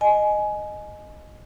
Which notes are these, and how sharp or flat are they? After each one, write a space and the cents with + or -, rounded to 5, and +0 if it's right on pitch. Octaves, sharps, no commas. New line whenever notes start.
D#5 -10 G#5 +15